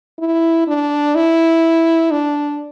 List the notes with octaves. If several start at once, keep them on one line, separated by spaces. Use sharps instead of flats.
E4
D4
E4
D4